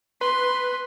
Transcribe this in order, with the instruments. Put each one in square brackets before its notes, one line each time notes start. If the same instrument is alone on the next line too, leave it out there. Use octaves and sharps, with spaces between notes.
[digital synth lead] B4 [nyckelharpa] C6